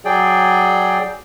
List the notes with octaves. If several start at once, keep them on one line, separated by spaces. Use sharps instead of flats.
F#3 G#4 D5 G5